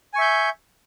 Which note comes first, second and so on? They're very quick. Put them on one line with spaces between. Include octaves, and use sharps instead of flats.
G#5 C#6 E5 G6